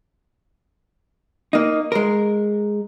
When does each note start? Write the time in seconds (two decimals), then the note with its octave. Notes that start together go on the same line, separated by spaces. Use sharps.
1.53 A#3 D#4
1.92 G#3 A#4